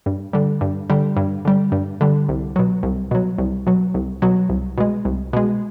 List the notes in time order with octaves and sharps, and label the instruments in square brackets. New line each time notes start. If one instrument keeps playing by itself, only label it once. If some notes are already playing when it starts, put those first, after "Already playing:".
[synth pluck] G2
D3 G3
G2
D3 G3
G2
D3 G3
G2
D3 G3
C2
B2 F#3
C2
B2 F#3
C2
B2 F#3
C2
B2 F#3
C2
B2 G#3
C2
B2 G#3